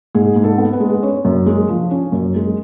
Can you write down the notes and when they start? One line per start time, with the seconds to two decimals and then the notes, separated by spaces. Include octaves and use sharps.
0.15 G#2 G#4
0.36 G#2
0.44 A4
0.58 B3
0.73 B4
0.80 G#3
1.02 C#4 C#5
1.25 F#2
1.46 G#3
1.69 F3
1.91 C#4
2.12 F#2
2.35 G#3